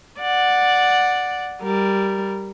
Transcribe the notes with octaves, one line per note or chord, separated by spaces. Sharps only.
D5 F#5
G3 A#4